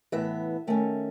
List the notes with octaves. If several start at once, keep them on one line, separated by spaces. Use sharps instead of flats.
A2 E3 B3 E5
D#3 A3 C#4